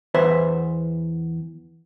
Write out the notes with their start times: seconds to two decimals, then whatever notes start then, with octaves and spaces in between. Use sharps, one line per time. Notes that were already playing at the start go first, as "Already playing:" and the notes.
0.14 E2 B4 C5 E5